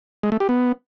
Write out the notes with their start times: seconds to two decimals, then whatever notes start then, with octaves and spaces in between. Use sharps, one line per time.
0.23 G#3
0.32 A3
0.40 G4
0.49 B3